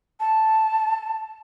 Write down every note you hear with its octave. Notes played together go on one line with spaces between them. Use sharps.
A5